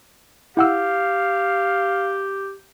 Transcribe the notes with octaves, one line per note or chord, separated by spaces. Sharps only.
E4 G4 F5 F#5 E6